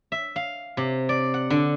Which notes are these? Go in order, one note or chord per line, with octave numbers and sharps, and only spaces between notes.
E5
F5
C3
D5
F#5
D3